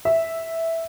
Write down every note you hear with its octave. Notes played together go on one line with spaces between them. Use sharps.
E5